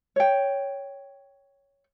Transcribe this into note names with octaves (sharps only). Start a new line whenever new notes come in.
C#5 G5